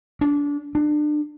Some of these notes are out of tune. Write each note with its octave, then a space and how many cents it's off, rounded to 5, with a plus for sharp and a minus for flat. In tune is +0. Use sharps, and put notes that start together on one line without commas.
D4 -25
D4 +30